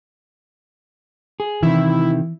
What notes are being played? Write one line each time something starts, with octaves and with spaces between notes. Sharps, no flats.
G#4
C3 D#3 E3 E4